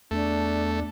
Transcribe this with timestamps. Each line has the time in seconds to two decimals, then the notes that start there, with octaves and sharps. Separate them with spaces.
0.11 E2 A3 D4